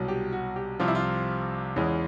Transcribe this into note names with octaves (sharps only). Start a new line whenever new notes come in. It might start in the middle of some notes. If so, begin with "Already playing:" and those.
Already playing: C2 B2 F#3
G4
F#4
G4
C2 C3 F3 F4
E4
F4
E2 C#3 E3 G#3